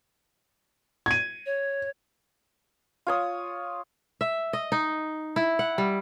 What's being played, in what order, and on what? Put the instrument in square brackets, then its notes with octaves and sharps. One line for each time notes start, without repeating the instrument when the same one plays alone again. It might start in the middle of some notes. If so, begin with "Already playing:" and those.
[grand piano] G#6 D#7
[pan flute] C#5
[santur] F4 C#5 D#6
[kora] E5
D#5
D#4
E4
F#5
G3